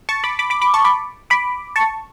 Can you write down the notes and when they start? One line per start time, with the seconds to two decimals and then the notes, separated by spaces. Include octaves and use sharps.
0.09 A5 C#6
0.24 B5 D6
0.39 B5 D6
0.50 B5 D6
0.61 B5 D6
0.74 A5 C#6
0.85 B5 D6
1.30 B5 D6
1.76 A5 C#6